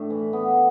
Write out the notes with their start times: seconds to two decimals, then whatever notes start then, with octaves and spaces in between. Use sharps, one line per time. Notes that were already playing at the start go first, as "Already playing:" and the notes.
Already playing: A2 D4
0.10 E3
0.33 B3